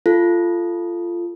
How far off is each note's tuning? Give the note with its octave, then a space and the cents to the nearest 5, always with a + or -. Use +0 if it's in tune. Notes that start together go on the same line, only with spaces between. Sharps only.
F4 -15 A4 +0